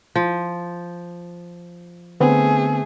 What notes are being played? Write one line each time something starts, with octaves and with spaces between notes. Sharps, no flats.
F3
D3 A3 B3 C4 G#4